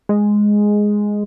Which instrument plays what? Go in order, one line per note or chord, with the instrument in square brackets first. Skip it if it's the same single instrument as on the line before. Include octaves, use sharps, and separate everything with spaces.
[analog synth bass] G#3